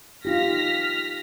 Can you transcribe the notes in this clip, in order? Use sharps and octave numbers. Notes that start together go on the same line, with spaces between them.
D#4 F4 G4 F6 A#6 B6